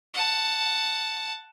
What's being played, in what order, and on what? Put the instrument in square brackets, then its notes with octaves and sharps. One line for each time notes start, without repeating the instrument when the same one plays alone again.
[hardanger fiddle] F#5 A5